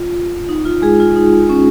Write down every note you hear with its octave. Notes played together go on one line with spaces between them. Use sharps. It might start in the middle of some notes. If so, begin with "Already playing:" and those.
Already playing: F4
D#4
F4
G#3 G#4
F4
D#4
C#4